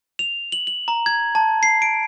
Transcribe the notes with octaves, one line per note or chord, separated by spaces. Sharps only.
F7
F#7
F#7
A#5
G#6
A5
C7
D7